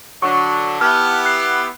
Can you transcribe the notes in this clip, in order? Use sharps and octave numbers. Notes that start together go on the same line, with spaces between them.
D3 F#3 D4 C#6
B3 E4 G4 A5 F6
F#6 C7